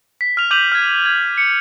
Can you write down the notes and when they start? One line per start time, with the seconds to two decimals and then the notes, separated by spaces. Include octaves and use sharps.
0.21 B6
0.37 F6 F7
0.51 D6 G6 D#7 F7 F#7
0.72 F6 G#6
1.06 G#6
1.38 C#7